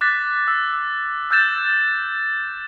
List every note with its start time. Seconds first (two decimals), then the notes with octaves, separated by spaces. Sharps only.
0.01 D6 F#6 A6 B6
0.48 E6
1.31 E6 F#6 G6 A6 E7